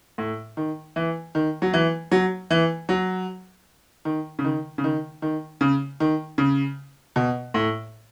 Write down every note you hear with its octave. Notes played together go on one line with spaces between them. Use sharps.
A2
D#3
E3
D#3
F#3
E3
F#3
E3
F#3
D#3
C#3
D#3
C#3
D#3
D#3
C#3
D#3
C#3
B2
A2